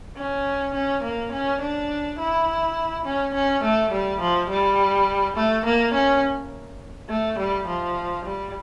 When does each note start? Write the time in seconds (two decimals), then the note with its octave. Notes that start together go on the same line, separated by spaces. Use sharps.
0.17 C#4
0.75 C#4
1.04 A#3
1.32 C#4
1.61 D4
2.19 E4
3.06 C#4
3.34 C#4
3.64 A3
3.92 G3
4.21 F3
4.50 G3
5.36 A3
5.66 A#3
5.94 C#4
7.10 A3
7.39 G3
7.67 F3
8.25 G3